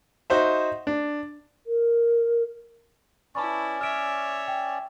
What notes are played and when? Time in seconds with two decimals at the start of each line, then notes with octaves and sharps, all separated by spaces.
0.30 D#4 F#4 C5 E5
0.87 D4
1.67 A#4
3.35 C#4 E4 B4 D5 A5 B5 C#6
3.81 C#5 E5 F6 D7
4.48 G5